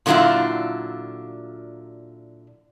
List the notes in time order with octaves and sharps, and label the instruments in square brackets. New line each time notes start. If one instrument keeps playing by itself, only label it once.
[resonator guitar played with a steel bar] A#2 D3 F#3 D4 E4 F4